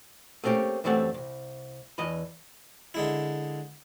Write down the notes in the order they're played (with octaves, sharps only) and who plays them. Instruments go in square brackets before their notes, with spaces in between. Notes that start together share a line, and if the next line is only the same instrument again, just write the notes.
[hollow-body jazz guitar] A3 A#3 C4 C#4 G4
F#2 E3 G3 A3 C4 F#5
C2
E2 E3 D#5 B5
[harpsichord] D3 G#3 E4